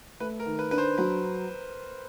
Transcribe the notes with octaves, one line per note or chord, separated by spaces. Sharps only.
A3 B4
A#4
D#3
B4
D4 B4
C5
F#3 B4